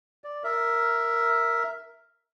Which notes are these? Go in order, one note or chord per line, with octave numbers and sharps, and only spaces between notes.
D5
A#4 E5